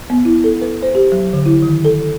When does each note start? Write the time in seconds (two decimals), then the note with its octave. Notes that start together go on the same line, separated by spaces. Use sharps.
0.10 B3
0.25 E4
0.44 A4
0.62 B4
0.83 C5
0.95 G4
1.12 F#3
1.33 D3
1.46 E4
1.63 D#3
1.85 A4